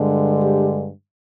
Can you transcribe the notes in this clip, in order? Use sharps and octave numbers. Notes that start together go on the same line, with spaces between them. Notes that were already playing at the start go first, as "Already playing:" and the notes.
Already playing: G2 D3 G#3
G4